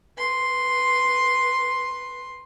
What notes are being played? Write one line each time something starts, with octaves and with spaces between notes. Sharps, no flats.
B4 C6